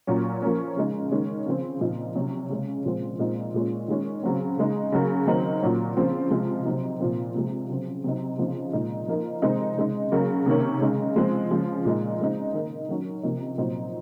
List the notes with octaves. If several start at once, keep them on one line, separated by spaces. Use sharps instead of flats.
A#2 F#3 C#4
F3 A#3 C#4
C#3 G#3 D#4
D#3 G#3 C#4
C#3 F3 C4
A#2 F3 C4 D#4
C3 F#3 C#4
C#3 G#3 C#4
A#2 F3 G#3 C4
A#2 G#3 C4 D#4
A#2 G#3 C#4
D#3 G#3 C#4
C#3 F#3 C4
C#3 G#3 D#4
C#3 F#3 A#3
D#3 F#3 C4 D#4
A#2 F#3 C#4
C#3 F3 C4
C3 F3 G#3
C3 F#3 C4 D#4
A#2 F3 C4
C3 F3 G#3
C#3 F#3 C4
C3 F#3 C4 D#4
C#3 F3 C4 D#4
A#2 G#3 D#4
F3 A#3 D#4
C3 D#3 G#3 C4 D#4
C#3 G#3 D#4
C#3 F#3 A#3
C3 D#3 A#3 C#4
C#3 G#3 D#4
F3 G#3 C4
C#3 F3 G#3
A#2 G#3 D#4
C#3 G#3 C4 D#4
D#3 A#3 D#4
D#3 F#3 C#4
C3 F3 A#3 D#4
A#2 F#3 C4 D#4